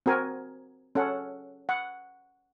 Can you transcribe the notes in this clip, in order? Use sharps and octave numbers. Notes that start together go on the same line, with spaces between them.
C4 F#4 A#4 G#5
C#4 A4 F#5
F#5